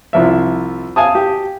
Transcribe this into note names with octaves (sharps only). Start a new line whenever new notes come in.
C2 F3 E5
F5 G#5 A5 D#6
G4